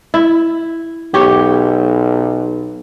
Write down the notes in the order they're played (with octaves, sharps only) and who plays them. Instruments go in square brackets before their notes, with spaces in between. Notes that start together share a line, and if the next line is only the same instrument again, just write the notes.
[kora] E4
[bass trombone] B1 [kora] G4 C#5